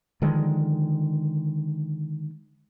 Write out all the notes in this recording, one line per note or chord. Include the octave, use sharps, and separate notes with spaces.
D3 D#3 F3 G#3